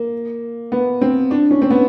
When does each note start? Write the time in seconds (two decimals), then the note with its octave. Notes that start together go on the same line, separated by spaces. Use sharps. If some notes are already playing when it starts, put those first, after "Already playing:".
Already playing: A#3
0.72 B3
1.01 C4
1.31 D4
1.51 C#4
1.62 C4
1.70 B3